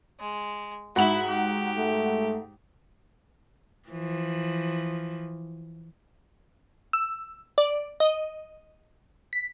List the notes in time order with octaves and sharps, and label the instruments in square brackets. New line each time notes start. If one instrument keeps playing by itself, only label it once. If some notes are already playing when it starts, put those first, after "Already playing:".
[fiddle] G#3
[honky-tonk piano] G#2 F#5 F#7 [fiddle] E4 E5 [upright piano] F#4
[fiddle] G4
[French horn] A3
[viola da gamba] E3 F3
[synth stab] E6
D5
D#5
B6